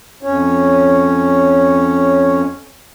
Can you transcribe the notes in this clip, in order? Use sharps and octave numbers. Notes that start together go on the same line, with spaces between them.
F2 C#4 C#5